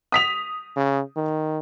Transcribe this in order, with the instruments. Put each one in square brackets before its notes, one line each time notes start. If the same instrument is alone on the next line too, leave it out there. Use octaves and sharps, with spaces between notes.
[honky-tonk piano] D#6 B6 F7
[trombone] C#3
D#3